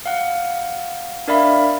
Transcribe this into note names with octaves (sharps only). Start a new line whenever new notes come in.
F5 F#5
D4 A#4 D5 E5 F5 B5